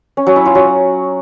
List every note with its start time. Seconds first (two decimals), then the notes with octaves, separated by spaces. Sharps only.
0.17 C#4
0.27 F#3
0.36 E4
0.45 F4
0.55 F#3